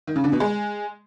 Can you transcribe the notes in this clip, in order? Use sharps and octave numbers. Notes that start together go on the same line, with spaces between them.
D#3
C#3
D3
B2
G#3